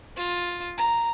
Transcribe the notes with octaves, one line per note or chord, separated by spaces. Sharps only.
F4
A#5